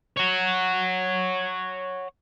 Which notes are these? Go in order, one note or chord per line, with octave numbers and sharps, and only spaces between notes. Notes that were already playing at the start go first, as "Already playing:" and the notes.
C#5 F#5